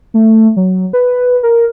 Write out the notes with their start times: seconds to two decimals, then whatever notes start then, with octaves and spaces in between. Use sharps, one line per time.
0.14 A3
0.57 F#3
0.93 B4
1.43 A#4